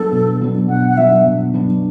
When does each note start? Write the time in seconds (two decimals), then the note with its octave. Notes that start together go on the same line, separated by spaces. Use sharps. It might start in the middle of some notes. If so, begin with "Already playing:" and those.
Already playing: F#3 B3 D4 A4
0.12 B2
0.41 F#3 B3 D4
0.68 B2 F#5
0.89 F#5
0.97 F#3 B3 D4 E5
1.26 B2
1.54 F#3 B3 D4